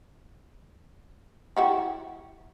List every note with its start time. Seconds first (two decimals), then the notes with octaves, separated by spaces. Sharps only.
1.57 E4 F#4 G4